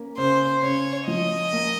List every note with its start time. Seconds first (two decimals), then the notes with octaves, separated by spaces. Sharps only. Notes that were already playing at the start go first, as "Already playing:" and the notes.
Already playing: A#3 C#4
0.18 C#3 C5
0.63 C#3 C#5
1.08 F3 D#5
1.53 A#3